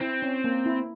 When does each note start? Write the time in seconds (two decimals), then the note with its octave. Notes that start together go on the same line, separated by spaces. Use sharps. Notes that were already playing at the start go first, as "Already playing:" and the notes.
0.01 C4 E4
0.22 C#4
0.44 A#3
0.66 E4